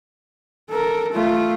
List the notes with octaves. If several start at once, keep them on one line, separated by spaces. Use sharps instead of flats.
A4 A#4
A3 F4